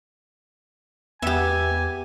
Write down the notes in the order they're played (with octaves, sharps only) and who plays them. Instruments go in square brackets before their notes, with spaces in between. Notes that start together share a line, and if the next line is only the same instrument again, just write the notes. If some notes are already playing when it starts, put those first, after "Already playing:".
[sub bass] E2 [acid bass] B3 [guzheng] G4 E5 [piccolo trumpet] G#5